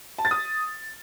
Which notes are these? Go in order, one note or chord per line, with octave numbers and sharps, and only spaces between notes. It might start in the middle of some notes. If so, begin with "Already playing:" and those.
A5
A6
D#6